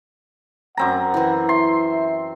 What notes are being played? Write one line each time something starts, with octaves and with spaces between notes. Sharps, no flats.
F#2 C4 F#5 A#5
E3 E4
E5 C6